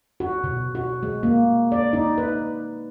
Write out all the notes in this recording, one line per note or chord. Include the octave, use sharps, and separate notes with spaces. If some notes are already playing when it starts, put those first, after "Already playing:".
F#4
B2
F#4
G#3
A#3
D5
D#4
B4